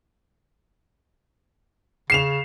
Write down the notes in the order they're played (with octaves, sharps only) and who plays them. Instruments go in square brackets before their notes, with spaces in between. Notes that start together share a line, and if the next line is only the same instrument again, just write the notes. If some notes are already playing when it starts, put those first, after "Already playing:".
[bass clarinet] C#3 [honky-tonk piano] C7 E7 F7